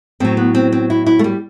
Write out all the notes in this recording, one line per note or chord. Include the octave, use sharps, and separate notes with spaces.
A2 F#3 C4
B3
C4
C4
E4
E4
A3
G3